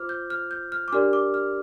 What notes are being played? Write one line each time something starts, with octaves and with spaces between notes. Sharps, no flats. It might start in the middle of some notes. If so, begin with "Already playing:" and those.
Already playing: F4 C5 D6 F6
G6
F6
G6
F6
D6
D4 G4 A#4 D5 F6
D6
F6